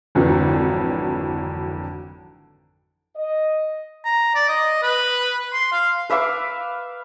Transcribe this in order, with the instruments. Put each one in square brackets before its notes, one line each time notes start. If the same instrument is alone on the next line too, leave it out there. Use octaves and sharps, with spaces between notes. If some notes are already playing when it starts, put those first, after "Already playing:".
[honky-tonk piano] G#1 F2 D3 E3 F#3
[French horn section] D#5
[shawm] A#5
D5
D#5
B4
C6
F5
[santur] B4 E5 F5 D6